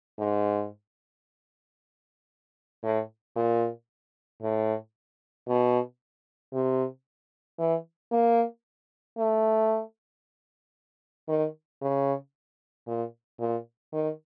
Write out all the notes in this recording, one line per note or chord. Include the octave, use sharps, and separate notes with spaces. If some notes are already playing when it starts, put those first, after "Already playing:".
G#2
A2
A#2
A2
B2
C3
E3
A#3
A3
D#3
C#3
A#2
A#2
D#3